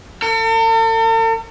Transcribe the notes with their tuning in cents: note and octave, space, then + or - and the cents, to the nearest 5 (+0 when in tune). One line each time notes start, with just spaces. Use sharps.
A4 +45